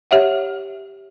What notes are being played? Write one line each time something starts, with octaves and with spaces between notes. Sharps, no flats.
G4 C#5 E5 F#5